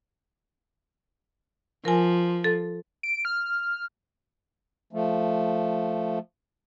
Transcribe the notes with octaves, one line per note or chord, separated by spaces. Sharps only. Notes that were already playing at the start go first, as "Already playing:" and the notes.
F3 A#4 G#5
A4
D7
F6
F3 A3